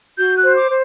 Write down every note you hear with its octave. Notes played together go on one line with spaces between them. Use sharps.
F#4 G6
F#6
C5
D6
C5